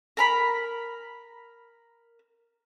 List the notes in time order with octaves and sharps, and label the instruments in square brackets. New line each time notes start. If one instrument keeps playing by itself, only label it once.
[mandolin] A#4 A#5 B5